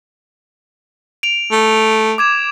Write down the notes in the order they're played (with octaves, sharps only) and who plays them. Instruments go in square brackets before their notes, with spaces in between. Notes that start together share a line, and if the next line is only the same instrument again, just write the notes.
[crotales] D7 F7
[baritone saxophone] A3
[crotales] D6 G#6 E7